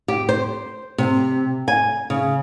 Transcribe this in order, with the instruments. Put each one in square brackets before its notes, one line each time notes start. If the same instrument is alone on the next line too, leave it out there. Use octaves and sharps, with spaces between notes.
[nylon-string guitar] G4
C5
C3
G#5
C#3